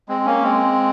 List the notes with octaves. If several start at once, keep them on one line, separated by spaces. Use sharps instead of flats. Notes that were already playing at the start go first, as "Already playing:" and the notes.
G#3 C4
A#3 C#4
G#3 C4